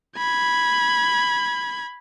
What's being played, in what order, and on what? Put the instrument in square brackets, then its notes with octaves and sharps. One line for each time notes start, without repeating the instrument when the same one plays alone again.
[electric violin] B5 G#6